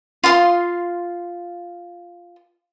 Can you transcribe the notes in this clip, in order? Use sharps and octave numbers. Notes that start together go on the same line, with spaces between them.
F4 F5 C6 D#6